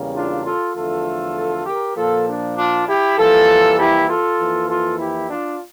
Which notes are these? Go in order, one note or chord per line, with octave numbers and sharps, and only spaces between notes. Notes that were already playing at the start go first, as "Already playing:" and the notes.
Already playing: E2 C#3 G3 A#3
D4 F4
F4 A4
E2 D3 F3 A3 F4 A4
G4 A#4
A#2 F3 A#3 F4 A4
D4
D4 F4
E4 G4
F2 E3 G3 A#3 F4 A4
E4 G4
F4 A4
F2 E3 A#3
F4 A4
E4 G4
D4 F4